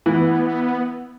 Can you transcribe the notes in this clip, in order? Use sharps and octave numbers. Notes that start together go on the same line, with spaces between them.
E3 B3